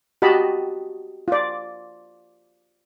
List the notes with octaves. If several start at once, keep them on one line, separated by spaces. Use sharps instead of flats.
F#4 G4 D#5 A5 B5
F4 D5